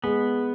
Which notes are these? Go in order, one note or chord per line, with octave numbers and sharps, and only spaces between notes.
G#3 B3